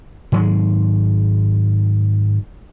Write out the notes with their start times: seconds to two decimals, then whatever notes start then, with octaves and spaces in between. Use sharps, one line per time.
0.32 G#2 D#3 F#3 G#3